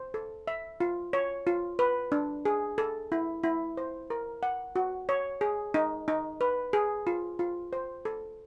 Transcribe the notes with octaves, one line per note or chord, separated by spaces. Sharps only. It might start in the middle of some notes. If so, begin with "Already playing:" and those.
Already playing: C5
A4
E5
F4
C#5
F4
B4
D4
G#4
A4
E4
E4
C5
A#4
F#5
F#4
C#5
G#4
D#4
D#4
B4
G#4
F4
F4
C5
A4